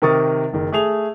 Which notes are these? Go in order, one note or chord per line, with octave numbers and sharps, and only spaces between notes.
C3 D#3 A#4 C#6 D#6 A6
F#1 D#3
A3 G#4 F7